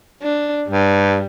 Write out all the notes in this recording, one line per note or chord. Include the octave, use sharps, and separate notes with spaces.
D4
G2 G3